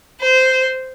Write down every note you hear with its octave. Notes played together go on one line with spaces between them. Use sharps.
C5